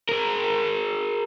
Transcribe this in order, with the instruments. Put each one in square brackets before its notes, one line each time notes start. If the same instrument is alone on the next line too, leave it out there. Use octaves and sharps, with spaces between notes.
[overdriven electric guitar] G#4 A#4